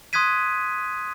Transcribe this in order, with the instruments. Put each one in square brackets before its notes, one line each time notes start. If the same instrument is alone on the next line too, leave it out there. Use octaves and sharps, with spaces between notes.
[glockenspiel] C6 D#6 F#6 G#6 B6 D#7